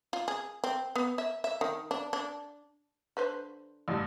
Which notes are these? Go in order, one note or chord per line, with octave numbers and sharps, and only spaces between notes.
F4
G#4
C4
B3
E5
E5
D#3
D4
D4
D3 B4 C5
A1 G2